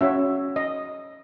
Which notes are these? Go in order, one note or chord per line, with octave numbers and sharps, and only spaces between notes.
C#4 F#4 C#5 E5
D#5